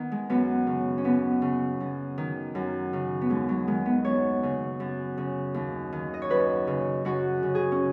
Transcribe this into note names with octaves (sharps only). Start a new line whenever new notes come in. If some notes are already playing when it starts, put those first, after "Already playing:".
Already playing: D#3 B3
G#3
F#2 B3
C#3
C#4
D#2 B3
C#3
F#2
D#3
F#2
C#3
B3
D#2 G#3
F#3
D#3 G#3
B3
F#2 C#5
C#3
F#2
C#3
D#2
D#3
D#5
C#5
F#2 B4
C#3
F#2 F#4
C#3
G#4
C#4